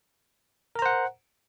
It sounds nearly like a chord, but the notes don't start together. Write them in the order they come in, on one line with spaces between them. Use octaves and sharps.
A#4 A#5 C5 F#5